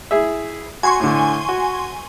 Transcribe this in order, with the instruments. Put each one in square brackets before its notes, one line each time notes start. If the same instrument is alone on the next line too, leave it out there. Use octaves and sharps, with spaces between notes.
[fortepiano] E4 G#4 E5
[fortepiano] F#4 [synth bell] G#5 C6 C#6
[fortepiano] A2 D3
F#4